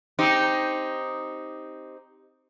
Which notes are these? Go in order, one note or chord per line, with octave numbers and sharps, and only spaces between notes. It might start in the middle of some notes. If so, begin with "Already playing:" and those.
C4 D#4 G4